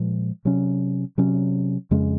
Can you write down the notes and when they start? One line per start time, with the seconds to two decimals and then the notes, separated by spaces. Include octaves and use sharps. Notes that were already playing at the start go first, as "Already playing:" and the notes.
Already playing: A#2 F3 G#3
0.45 C3 F#3 C#4
1.18 C3 F#3 C#4
1.91 F2 C#3 G#3 C#4